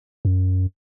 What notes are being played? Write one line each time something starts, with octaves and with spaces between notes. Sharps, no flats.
F#2